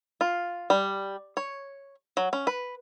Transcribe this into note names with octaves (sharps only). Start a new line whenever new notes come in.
F4
G3
C#5
F#3
C#4
B4